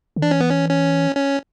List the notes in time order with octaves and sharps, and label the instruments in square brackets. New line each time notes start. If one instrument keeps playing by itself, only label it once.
[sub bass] D3
[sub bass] E3 [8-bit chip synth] D4
[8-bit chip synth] C#4
B3
C#4
C#4
C#4